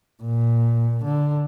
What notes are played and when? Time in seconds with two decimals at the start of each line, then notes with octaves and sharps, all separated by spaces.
0.23 A#2
1.04 D3